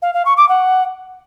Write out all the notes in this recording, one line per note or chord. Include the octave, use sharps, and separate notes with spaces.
F5
F5
C#6
D6
F#5